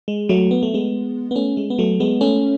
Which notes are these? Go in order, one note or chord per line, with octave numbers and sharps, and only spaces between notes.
G#3
F#3 A3
B3
A3
G#3 B3
B3
A3 C#4
G#3
B3
F#3 A3
G#3 B3
A3 C#4